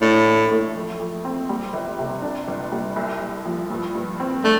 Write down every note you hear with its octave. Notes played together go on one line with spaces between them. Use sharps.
A2 D4
A1
A3
F2
F2
C4
G3
G1
C3
D4
G1
G3
C2
C2
F3
G2
G2
C4
A3 D4